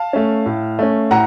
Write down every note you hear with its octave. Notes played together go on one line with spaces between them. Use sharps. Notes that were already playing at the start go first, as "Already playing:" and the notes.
Already playing: F5 A5
A3 C#4
A2
A3 C#4
A2 F#5 A#5